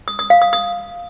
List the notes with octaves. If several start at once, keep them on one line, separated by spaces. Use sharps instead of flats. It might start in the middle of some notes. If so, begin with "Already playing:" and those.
D#6
D#6
F5
D#6
D#6